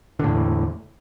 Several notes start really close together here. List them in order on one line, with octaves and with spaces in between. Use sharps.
D3 A2 E2